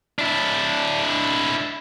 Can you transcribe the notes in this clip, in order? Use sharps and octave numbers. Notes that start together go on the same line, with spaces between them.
D4 E4